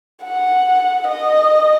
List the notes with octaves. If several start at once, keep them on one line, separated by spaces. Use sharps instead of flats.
F#5
D#5